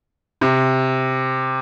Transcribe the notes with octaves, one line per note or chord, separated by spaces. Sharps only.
C3